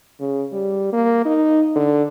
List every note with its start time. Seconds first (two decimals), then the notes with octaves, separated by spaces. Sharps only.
0.20 C#3
0.52 G3
0.92 A#3
1.25 D#4
1.76 D3